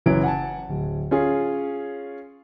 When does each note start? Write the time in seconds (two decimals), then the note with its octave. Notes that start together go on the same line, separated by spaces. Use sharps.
0.06 F#1 E3 F#3 C#4 D7
0.23 F#5 G#5 A5
0.69 D1
1.11 C#4 F4 G#4